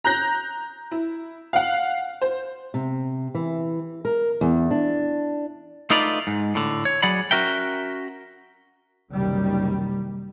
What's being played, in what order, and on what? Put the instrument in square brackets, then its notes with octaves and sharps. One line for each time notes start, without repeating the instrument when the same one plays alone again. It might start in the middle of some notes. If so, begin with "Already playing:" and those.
[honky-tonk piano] A#5 F#6 G6 A#6
E4
F5 F#5
C5
[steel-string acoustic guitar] C3
E3
A#4
E2
D4
[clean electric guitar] A3 D#4 F4 A#4 B4 D5
G#2
A2 D3
C#5
F#3 G#4 D5 F#5 B5
C#4 F#4 A#4 E5 G5
[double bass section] F#1 C2 D#3 G3